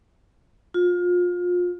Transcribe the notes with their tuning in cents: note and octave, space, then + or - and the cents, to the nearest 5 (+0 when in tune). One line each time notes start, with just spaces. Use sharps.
F4 +25